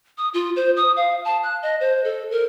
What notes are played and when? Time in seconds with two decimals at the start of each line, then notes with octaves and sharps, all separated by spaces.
0.18 D#6
0.34 F4
0.56 C5
0.76 D#6
0.96 F5
1.25 A5
1.43 F#6
1.62 D#5
1.80 C5
2.04 A4
2.31 A#4